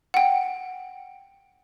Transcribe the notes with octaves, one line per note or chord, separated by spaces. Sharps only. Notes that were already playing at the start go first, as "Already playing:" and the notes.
F#5 G5